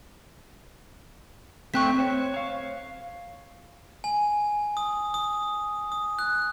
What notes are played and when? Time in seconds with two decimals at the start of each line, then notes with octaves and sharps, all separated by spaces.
1.74 A3 C4 G5 C#6 F#6 B6
1.98 C5 C#5
2.34 C#5 F5
4.04 G#5
4.77 D#6
5.14 D#6
5.92 D#6
6.19 F#6